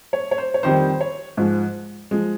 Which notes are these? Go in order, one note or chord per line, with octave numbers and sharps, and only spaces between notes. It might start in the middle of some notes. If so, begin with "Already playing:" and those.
C#5
C#5
C5
C#5
F2 D#3 G3 C5
C5
C#5
G#2 F3 G#3
F3 G#3